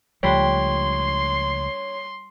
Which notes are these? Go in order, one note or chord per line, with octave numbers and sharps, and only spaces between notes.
C#2 F3 G3 A3 D4 C#5 C6